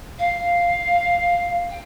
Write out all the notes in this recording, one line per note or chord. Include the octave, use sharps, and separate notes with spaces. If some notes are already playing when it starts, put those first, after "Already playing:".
F5
G5